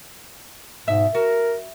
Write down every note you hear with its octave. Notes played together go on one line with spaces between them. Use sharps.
G#2 B2 E5
F#4 A#4